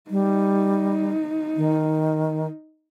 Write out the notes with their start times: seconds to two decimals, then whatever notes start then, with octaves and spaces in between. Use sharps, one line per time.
0.10 G3 D#4
1.57 D#3